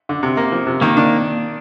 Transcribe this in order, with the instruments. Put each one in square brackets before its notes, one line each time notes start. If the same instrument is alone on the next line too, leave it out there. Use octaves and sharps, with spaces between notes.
[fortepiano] D3
C3
A#3
F3
C3
[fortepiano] D#3 [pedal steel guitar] A#3
[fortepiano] D4